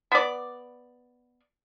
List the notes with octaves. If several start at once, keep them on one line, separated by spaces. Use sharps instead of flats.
B3 D5